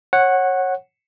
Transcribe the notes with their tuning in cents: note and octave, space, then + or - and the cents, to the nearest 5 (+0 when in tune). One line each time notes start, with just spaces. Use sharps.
C#5 -25 F#5 +0